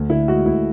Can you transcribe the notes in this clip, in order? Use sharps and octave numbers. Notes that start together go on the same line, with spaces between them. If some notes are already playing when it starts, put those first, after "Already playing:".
Already playing: D2
D3 E4
G#3 F#4
D2 E4